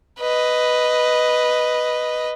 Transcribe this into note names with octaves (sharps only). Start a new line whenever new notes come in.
B4 D#5